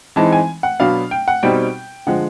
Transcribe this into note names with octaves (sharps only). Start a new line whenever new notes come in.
E3 G#3 C4 D#4 A5
G#5
F#5
B2 F#3 B3 D4 F5
G5
F#5
B2 G3 C4 D#4 G5
D3 F3 G#3 F#5